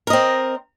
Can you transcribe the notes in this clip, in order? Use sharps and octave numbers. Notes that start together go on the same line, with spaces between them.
C4 A#4 D#5